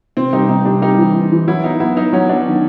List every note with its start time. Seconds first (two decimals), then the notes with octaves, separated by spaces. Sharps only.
0.17 C3 C4
0.33 G3 D#4
0.49 C3 D#4
0.65 G3 D4
0.82 G3 D#4
0.98 E3
1.15 E3
1.32 E3
1.47 F#3 E4
1.64 B3 D#4
1.80 B3 E4
1.97 F#3 D#4
2.13 F#3 C#4
2.29 B3 D4
2.46 D#3